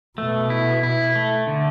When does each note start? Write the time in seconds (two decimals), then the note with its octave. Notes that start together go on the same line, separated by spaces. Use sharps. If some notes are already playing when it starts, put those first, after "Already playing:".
0.18 B2 A3
0.50 E4
0.83 E4
1.15 A3
1.47 D3